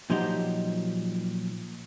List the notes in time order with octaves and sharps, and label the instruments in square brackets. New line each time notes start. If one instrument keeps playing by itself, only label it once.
[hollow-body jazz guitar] A#2 F3 F#3 D#4 G4 C5